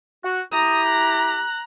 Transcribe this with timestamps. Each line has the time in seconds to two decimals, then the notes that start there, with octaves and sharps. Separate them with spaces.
0.24 F#4
0.52 E4 G4 A#5 D#6
0.87 F#6